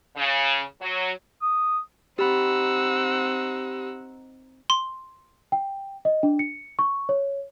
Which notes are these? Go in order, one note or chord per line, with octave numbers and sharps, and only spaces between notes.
C#3
F#3
D#6
C4 D#4 G4 F#5 B5 E6
C6
G5
D#5
D4
C#7
C#6
C#5